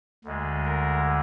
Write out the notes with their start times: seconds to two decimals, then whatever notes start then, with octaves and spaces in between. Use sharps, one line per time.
0.24 D2 D3 G#3
0.65 A#4